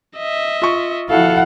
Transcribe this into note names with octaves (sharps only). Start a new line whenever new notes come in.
D#5 E5
F4 C#6
F3 E4 F#4 A4 F5 F#5